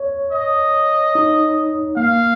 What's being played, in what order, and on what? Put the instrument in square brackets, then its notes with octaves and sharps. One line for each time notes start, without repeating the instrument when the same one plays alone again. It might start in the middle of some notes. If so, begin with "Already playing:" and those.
Already playing: [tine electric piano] C#5
[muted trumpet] D#5
[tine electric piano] D#4
[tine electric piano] A#3 [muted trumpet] F5